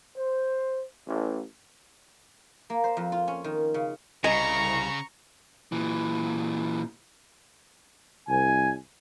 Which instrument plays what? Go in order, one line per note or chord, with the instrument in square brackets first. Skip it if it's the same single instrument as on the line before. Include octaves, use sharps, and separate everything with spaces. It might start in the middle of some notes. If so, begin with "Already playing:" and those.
[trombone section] C5
A1
[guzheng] A#3
C5
F2
F4
C#4
D#3
C#3
[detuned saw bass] C2 [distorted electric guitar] C#3 [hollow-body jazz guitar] D#5 G#5 [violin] A#5 C#6
[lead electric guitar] A#2 E3
[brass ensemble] C2 G#5